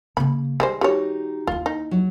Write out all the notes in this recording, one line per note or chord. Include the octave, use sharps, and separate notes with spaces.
C#3 A#3 B5
D#3 G3 G#3 C5
G3 D#4 F#4 G4 C#5
D#2 E4 F4
D#4
F#3